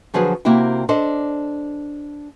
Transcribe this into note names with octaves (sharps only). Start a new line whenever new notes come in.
D3 F3 F#3 F#4 G#4 B4
C3 A#3 C4 E4 F#4 G5
D4 A4 C5 D5 D#5